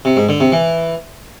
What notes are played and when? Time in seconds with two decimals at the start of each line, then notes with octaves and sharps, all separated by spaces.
0.05 C3
0.17 G#2
0.29 D3
0.40 C3
0.52 E3